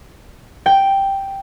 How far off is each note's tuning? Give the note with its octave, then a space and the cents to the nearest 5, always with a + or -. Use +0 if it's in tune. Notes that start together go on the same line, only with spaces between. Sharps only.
G5 +0